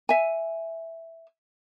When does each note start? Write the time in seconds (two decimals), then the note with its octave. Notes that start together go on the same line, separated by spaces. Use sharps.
0.09 E5 G#5